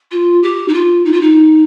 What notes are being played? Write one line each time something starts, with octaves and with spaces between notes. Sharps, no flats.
F4
G4
D#4
F4
D#4
F4
D#4